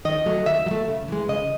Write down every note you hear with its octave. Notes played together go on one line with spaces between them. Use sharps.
D#3 D#5
F#3 A3
D#3 E5
F#3
A3
C#3
E3 G#3
C#3 D#5